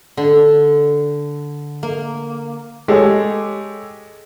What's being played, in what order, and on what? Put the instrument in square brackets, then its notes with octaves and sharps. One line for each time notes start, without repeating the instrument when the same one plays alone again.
[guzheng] D3
A#3
[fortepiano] G#3 [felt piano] G4 A4 C#5